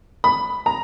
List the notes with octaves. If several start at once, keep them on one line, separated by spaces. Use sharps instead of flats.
B5
A#5